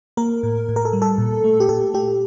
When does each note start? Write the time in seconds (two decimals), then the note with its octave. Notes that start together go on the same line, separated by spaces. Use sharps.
0.17 A#3 A#4
0.43 A2
0.69 A2
0.76 A#4
0.85 A4
0.93 G3
1.02 A4
1.18 A#2
1.44 A3
1.60 G4
1.69 A#2 A4
1.94 A3 G4